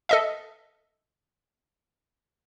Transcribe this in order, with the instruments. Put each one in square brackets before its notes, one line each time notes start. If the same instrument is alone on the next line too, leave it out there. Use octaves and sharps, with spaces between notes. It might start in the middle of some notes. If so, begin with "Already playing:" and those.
[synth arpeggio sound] A4 D#5 E5